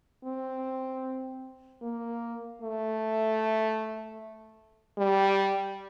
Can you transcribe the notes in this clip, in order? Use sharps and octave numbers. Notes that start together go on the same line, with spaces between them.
C4
A#3
A3
G3